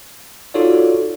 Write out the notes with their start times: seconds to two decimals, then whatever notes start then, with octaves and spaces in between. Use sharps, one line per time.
0.54 D#4 F4 F#4 A4 C#5 D5